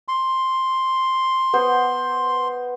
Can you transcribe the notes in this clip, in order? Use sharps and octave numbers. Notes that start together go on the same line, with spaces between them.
C6
B3 C5